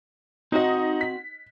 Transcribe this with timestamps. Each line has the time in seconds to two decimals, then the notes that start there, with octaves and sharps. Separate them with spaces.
0.52 C4 D#4 F#4 D#5 F#5
1.01 B6